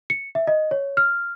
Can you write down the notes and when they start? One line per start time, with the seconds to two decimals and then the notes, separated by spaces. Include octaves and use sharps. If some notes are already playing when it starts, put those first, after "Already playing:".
0.10 C#7
0.35 E5
0.47 D#5
0.71 C#5
0.97 F6